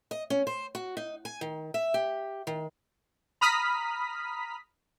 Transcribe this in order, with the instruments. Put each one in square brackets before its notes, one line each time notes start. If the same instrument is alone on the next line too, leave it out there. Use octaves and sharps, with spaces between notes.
[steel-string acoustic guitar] D#5
C#4
C5
F#4
D#4
G#5
D#3
E5
G4
D#3
[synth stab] A#5 B5 D#6 F6 B6